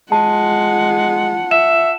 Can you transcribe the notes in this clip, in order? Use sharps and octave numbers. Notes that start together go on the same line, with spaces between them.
G#3 F4 F#5 A5
E5 E7